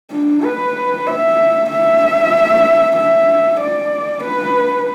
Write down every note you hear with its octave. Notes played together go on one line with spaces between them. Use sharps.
D4
B4
E5
E5
E5
D5
B4